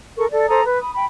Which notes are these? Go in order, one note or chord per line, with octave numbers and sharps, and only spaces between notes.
A4 A#4 C#6
A4 D5
A4 C5 A#5 D#6
B4
B5 D#6
G5 B5